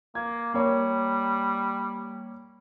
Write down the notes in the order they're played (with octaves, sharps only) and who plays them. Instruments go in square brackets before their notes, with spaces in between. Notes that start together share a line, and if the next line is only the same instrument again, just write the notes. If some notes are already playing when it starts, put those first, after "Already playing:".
[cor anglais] A#3 [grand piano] G#6
[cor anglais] G3 [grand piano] A#3 C#5